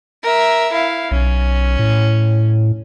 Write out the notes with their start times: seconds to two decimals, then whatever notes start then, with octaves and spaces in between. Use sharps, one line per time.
0.23 A#4 E5
0.72 E4 F5
1.11 B1 C#4
1.79 A2